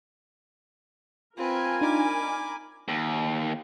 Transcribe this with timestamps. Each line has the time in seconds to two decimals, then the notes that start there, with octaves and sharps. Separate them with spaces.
1.38 C4 F4 A#4 B4 G#5
1.81 D4 D#4 B5 D6
2.88 D#2